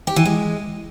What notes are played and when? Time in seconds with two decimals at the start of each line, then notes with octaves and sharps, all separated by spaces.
0.07 G4
0.16 E3
0.25 G#3